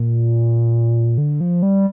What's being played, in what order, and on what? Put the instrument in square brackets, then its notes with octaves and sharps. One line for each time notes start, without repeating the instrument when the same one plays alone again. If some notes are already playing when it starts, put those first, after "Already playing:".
Already playing: [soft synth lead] A#2
D3
F3
G3